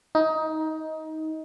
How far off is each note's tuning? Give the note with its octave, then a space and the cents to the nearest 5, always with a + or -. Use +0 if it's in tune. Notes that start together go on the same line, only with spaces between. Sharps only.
D#4 +20